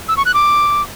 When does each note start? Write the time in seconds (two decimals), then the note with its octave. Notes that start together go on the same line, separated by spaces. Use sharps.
0.08 E6
0.17 C#6
0.26 F#6
0.34 D6